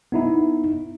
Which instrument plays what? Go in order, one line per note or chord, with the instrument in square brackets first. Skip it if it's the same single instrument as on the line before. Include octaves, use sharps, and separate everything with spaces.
[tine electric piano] B3 D#4 E4